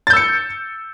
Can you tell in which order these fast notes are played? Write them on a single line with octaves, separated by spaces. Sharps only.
A6 G6 E6 C#7